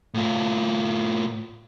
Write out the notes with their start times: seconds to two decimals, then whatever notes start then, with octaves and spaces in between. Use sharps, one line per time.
0.14 A2 F4